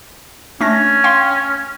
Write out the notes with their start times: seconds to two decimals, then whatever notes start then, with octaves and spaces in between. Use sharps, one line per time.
0.60 A3 C#4 D4 A#6
1.04 F5 G5 C6